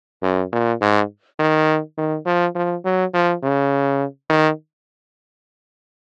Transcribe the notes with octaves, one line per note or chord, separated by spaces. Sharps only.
F#2
A#2
G#2
D#3
D#3
F3
F3
F#3
F3
C#3
D#3